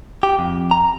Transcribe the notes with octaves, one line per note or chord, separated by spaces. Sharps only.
G4
F2
A#5